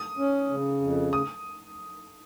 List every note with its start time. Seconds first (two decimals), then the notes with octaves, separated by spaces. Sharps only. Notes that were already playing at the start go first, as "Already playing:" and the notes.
Already playing: D#6
0.18 C#4
0.50 C#3
0.81 F2
1.13 D#6